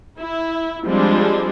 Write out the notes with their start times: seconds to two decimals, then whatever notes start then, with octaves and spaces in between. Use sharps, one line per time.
0.18 E4
0.84 F3 G3 G#3 C4 D4